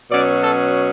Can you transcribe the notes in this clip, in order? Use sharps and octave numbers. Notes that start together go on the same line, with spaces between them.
B2 F#3 C#4 D5
A4